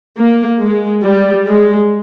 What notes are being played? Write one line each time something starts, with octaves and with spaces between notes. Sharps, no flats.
A#3
G#3
G3
G#3